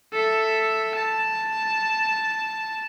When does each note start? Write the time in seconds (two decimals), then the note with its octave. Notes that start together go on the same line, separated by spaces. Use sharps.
0.12 A4 E5
0.96 A5